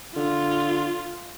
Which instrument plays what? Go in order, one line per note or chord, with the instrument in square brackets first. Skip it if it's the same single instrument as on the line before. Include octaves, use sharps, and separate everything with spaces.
[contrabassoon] D3 [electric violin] F4